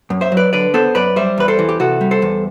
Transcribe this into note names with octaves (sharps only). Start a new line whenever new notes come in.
F#2
C5 E5
F#3
B4 D5
D3 B4 D5
B3 A4 C5
F#2 B4 D5
G3 C5 E5
E2 B4
A4 C5
E3
G4
C3 F#4 A4
G3
A4 C5
E2